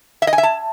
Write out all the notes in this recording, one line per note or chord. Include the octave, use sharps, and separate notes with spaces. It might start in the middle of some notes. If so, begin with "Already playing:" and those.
E5
D#5
G#5
E5
A5